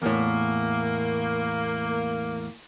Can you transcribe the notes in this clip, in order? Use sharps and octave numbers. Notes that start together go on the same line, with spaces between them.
E2 A2 A#3